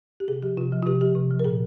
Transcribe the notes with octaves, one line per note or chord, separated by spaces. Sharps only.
G4
C3 G#4
F3 G4
C3 F4
F3
F4
C3 G4
F3 G4
C3
F3
A#4
A#2 G#4